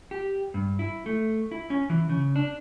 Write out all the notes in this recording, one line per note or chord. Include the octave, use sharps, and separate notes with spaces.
G4
G2
E4
A3
E4
C#4
E3
C#3
D4